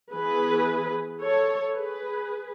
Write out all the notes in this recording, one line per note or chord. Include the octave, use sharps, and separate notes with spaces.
E3 B3 G#4 B4
A4 C#5
G#4 B4